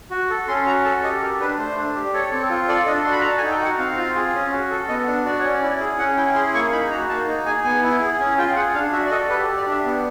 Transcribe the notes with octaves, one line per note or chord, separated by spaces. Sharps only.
F#4
A4
C#4 C6
F#4 A#5
A4 A5
G4 D#5
G4 A#4
D4 B4
A3 C5
D4
G4
A4 C#5
C4
F4
A4 D5
D4 D#5
F#4 C6
B5
A4 A#5
A5
G#5
D#4
G5
F#4 F#5
C4 F5
F4
G#4
C#4
F#4
A4
B3 D#5
D4
F#4 D5
C#4 C#5
D5
E4
G#4
C#4 F#5
E4 G5
G#4 C6
A#3 C#6
D#4 B5
F#4 A#5
A#3 A5
D#4
G#4 G#5
B3 G#5
E4
G#4
C#4
F4 G5
G#4 F#5
D4 F5
F#4 E5
D5
A4 D#5
G4 B4
A4
G4
D5
D4 E5
B3